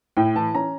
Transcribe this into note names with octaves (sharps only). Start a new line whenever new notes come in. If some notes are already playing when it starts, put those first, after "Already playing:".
A2 G5
E3 A5
C#4 A#5